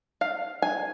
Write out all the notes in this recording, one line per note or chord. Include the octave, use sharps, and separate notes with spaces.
F5
G#5